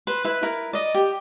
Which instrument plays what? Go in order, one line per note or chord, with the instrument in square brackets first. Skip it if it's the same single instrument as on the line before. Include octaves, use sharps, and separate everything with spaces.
[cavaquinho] B4 C5
E4 B4
E4 A#4
D5 D#5
G4